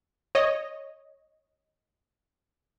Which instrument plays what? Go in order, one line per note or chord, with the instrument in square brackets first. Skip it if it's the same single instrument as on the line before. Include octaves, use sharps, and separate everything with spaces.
[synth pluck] C#5 D#5